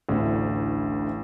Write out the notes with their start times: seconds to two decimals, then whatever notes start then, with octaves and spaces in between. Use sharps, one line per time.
0.09 A1 D2 A2 D3